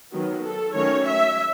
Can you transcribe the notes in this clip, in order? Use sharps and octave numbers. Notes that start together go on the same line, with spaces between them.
D#3 F#3 B3
A4
D#3 F#3 A3 C#4 C#5
E5